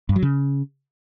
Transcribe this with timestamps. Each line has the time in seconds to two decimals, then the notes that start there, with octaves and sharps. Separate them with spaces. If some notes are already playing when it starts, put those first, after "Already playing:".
0.09 G2
0.16 F#3
0.22 C#3